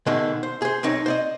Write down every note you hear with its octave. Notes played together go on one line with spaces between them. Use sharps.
B2 D3 D#3 G#3 A3
C5
G#4 C5
B1 C4 D#4 C#5
C5 D5 D#5